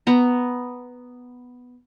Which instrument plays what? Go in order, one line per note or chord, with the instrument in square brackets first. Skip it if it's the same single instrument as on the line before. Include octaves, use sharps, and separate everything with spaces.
[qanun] B3 A#5